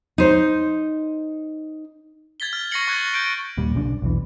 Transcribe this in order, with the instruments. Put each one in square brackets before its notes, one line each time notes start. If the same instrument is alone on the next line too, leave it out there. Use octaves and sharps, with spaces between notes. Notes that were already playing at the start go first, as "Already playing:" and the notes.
[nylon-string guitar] D#4 C5
[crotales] G#6 A6 B6 G7
F6 A6
C#6 A6 A#6 C7 C#7 F#7
C#6 F#6 G#6
G6 D7
[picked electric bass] D#2 A#2 G3
B1 C#3 C#4 D4
B1 E2 E3